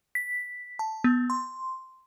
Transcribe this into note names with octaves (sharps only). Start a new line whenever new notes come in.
B6
A5
B3
C6